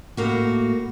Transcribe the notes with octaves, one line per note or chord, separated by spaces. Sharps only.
A2 A#3 F#4